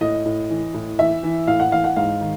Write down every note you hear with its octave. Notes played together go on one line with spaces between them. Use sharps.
A2 D#5
A2
E3
A2
E3 E5
E3
A2 F5
F#5
E3 F5
F#5
G#2 F5
D#3